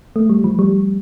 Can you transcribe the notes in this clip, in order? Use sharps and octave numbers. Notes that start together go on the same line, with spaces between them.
A3
G3
F3
G3